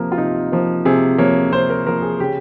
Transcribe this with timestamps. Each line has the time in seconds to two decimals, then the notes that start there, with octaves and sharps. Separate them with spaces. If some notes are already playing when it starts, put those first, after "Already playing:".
Already playing: C3 F3 A#3 A#4
0.12 F4
0.18 C3 D#4
0.52 F3 A#3
0.85 C3 G#4
1.18 F3 A#3 C#5
1.52 C3 C5
1.70 A#4
1.86 F3 A#3 A#4
2.02 G#4
2.19 C#3 G4